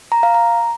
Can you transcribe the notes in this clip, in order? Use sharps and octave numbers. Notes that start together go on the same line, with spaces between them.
A#5
F5
A#5